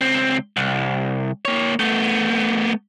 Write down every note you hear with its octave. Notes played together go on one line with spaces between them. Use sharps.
C#2 C4
C2
A#3 C#5
A3 B3